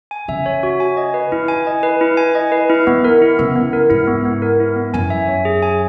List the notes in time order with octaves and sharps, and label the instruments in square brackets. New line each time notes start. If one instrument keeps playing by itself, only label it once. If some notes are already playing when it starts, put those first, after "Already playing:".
[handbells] G#5
[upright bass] C#3 [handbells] E5
[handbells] C#5
F#4
G#5
D#5
B4
[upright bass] D#3 [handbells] E4
[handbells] G#5
D#5
B4
E4
G#5
D#5
B4
E4
[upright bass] D#3 [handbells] B3
[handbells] A#4
E4
[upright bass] C#3 [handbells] B3
[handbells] B3
A#4
[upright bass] G#2 [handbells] E4
[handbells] B3
B3
A#4
E4
B3
[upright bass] F#2 [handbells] G#5
[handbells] E5
C#5
G#4
G#5